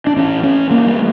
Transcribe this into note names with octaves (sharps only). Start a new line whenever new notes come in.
D4
A1 A2 C#4
C#4
A#3
G3